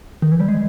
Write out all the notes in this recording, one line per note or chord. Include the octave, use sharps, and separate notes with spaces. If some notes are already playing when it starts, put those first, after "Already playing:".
D#3
E3
G3
G#3